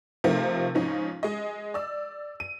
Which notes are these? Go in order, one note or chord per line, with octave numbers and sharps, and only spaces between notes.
C3 F3 A3 C4 D#4 A#4
G#2 F3 C#4 D#4
G#3 D#5
D5 E6
D#7